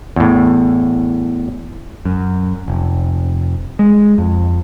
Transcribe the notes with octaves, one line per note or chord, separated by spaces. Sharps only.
E2 A2
F#2
F1
G#3
F2